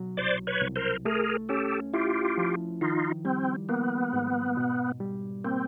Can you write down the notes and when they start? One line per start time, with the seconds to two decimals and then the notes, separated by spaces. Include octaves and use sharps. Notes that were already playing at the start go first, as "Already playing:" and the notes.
Already playing: B2 F#3
0.17 C2 C5 D5
0.47 B4 C#5
0.61 C2
0.76 A#4 C5
1.05 A3 G#4 A#4
1.49 C#4 G4 A4
1.93 E4 F4 G4
2.38 F3
2.81 D#3 D#4 F4
3.25 G3 C4
3.69 A#3 B3
4.13 G#2
4.57 B2
5.00 G3
5.44 A#3 C4